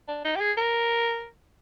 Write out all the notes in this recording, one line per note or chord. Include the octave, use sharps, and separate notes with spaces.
D4
D#4
G4
G#4
A#4